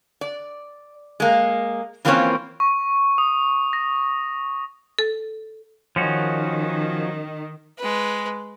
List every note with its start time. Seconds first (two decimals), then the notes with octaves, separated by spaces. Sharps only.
0.21 D5
1.20 G#3 A#3
2.05 E3 F3 A#3 C4 C#4 C#5
2.60 C#6
3.18 D#6
3.73 A#6
4.99 A4
5.96 D#3 F3 C#4 F#4
7.78 G#3 B4